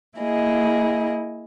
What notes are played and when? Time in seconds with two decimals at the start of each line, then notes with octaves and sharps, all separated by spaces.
0.18 A#3 E4 G#4 D#5